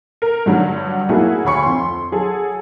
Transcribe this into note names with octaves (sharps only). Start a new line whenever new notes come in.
A#4
G2 D3 F#3 G3
F#3 A3 A#3 E4 F#4 G#4
D2 C#5 B5 C#6 C#7
F2 C6
F#3 G#4 A4